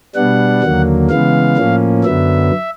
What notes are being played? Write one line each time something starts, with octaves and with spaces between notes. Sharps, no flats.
B2 G3 B3 D4 F#5
D#2 D3 F#3 A#3
C#3 E3 G#3 B3 F5
A2 F3 A#3 C#4
F#2 D3 F#3 B3 E5